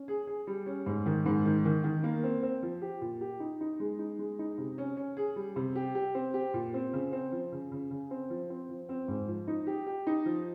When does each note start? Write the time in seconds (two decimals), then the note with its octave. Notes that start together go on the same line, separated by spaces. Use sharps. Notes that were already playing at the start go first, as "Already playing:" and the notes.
Already playing: C#4
0.08 G#4
0.27 G#4
0.47 G3
0.66 C#4
0.86 G#2
1.06 D#3
1.26 G#2
1.45 D#3
1.65 D#3
1.84 D#3
2.03 A#3
2.23 C4
2.43 C4
2.62 F3
2.82 G4
3.01 A#2
3.21 G4
3.40 D#4
3.61 D#4
3.80 G#3
3.99 D#4
4.19 G#3
4.39 D#4
4.58 C3
4.78 C#4
4.97 C#4
5.17 G#4
5.36 G3
5.56 C3
5.76 G4
5.95 G4
6.15 C4
6.34 G4
6.54 A#2
6.74 C4
6.93 C#3
7.12 C4
7.32 F3
7.52 C#3
7.71 C#3
7.91 C#3
8.11 C4
8.30 F3
8.50 C4
8.69 F3
8.89 C4
9.08 G#2
9.28 F3
9.47 D#4
9.67 G4
9.86 G4
10.07 D#4
10.26 F3